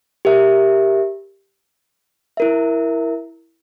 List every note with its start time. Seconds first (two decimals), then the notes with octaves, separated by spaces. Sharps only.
0.25 G4 A#4 E5
2.37 E4 A#4 E5